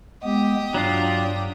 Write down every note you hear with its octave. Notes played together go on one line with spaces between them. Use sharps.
G#3 B3 G4 D#6
G2 F#3 D4 F4